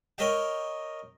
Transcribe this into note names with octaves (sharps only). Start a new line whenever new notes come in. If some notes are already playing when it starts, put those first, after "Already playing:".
A#4 C#5 D#5 E5 G5